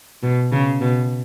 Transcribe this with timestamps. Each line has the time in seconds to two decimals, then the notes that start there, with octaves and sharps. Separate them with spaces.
0.23 B2
0.52 C#3
0.81 B2